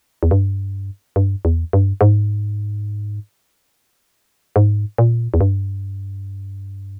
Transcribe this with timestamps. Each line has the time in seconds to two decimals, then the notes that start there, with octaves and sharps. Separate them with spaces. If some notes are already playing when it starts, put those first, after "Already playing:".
0.23 E2
0.31 G2
1.16 G2
1.45 E2
1.73 G2
2.01 G#2
4.56 G#2
4.98 A#2
5.34 E2
5.41 G2